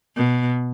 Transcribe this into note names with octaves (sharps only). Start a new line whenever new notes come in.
B2